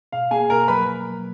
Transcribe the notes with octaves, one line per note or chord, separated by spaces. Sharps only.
B2 F5
A#3 G#4 G#5
B2 A#4 A#5
F#3 B4 B5